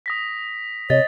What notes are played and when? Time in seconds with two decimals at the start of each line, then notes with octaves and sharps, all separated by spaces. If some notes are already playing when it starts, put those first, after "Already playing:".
0.06 D#6 A#6 B6
0.90 C3 C#5 D#5 A6